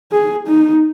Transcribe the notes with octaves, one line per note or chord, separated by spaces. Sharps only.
G#4
D#4